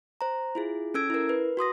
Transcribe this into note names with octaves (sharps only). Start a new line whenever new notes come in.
C5 A#5
E4 F4 G#4
C#4 A4 E6 G#6 D7
E4 A#4
B4
F#4 C6 D#6 A#6